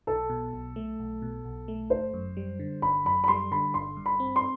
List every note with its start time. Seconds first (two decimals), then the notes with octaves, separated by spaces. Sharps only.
0.07 B1 A4
0.30 B2
0.53 B1
0.76 A3
1.00 B1
1.22 B2
1.45 B1
1.68 A3
1.90 G1 C5
2.14 F#2
2.37 G3
2.59 D3
2.82 G1 B5
3.05 F#2 B5
3.24 B5
3.28 G3 C6
3.51 D3 B5
3.74 G1 C6
3.97 G2
4.06 B5
4.20 C4
4.36 C6